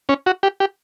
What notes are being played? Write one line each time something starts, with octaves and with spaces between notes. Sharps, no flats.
C#4
F#4
G4
G4